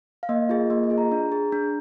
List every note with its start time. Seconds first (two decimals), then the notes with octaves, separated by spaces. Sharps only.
0.23 F5
0.29 A#3 D#5
0.49 F4 G#4
0.70 A#3 D#5
0.84 D#5
0.90 F4 G#4
0.98 A#5
1.11 D4
1.32 G#4
1.52 D4